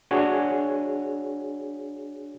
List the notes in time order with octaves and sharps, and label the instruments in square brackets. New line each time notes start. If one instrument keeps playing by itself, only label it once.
[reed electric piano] D4 F#4 G#4 C#5